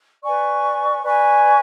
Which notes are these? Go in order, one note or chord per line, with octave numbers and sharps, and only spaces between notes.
B4 D5 G#5 C#6
B4 D5 G#5 C#6